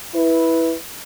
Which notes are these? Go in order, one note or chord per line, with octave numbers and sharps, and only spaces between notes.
E4 B4